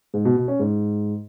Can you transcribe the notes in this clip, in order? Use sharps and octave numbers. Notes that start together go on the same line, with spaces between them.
G#2
B2
B2
C#4
G#2